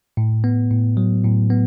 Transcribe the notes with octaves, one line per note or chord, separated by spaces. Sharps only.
A2
B3
A2
F#3
A2
B3